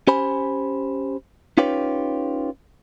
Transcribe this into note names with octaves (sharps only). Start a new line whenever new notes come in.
C#4 G4 C5 G#5 B5
C#4 D#4 F4 G4 B4 C#5